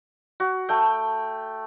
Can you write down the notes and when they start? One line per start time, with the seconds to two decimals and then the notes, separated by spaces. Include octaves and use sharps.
0.40 F#4
0.69 A3 G5